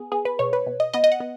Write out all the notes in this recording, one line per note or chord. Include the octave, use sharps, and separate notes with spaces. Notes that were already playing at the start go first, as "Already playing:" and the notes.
Already playing: B3 G#4
B3 G#4
B4
B2 C#5
B4
B2
D#5
B3 D#5
D#5
F#5
B3